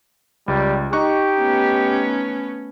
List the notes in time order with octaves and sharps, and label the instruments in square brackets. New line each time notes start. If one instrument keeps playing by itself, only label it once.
[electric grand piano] C#2 [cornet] G3
[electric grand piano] D#4 C#6 F#6 [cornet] G4
[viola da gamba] A3 B3 C#4